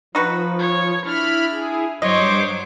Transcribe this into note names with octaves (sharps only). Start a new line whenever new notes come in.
F3 D#4 F#4 B4
C#5
D4 E4 B5 F6
E4 G#4
G2 F#3 C5 C#5 D#5 C6 D6